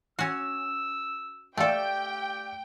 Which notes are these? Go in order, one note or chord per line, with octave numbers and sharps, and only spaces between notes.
C#4 F#4 E6
A3 G4 A4 D5 F5 G5 E6